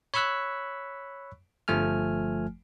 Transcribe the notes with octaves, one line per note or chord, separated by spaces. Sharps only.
C#5 B5 C#6 E6 F#6 B6
G1 F3 A3 G#5 F6